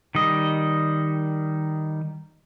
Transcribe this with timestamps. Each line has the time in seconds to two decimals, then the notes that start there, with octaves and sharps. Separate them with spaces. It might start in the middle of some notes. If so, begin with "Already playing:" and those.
0.15 D#3 G3 D#5